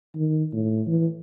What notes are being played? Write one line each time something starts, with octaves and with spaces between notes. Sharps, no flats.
D#3
A2
E3